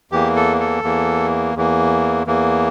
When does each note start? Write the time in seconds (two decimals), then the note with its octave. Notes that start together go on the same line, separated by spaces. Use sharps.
0.12 E2 E3 A#3 G4
0.36 A4
0.60 A4
0.83 E2 E3 A#3
1.56 E2 E3 A#3
2.27 E2 E3 A#3